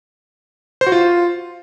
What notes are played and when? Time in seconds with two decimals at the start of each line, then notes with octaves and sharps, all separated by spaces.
0.81 C5
0.87 F#4
0.92 F4